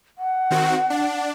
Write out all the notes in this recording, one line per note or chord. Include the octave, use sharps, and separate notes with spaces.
F#5
D#3 C4 F#4
D4